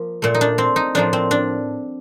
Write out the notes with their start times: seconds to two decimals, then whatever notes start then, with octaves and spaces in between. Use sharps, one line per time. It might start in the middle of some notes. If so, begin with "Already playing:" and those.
Already playing: F3 A#3
0.22 A#2 A3
0.35 D#4
0.41 D4
0.58 C4
0.76 D#4
0.95 A2 F3 A#3 D4
1.13 C4
1.31 D4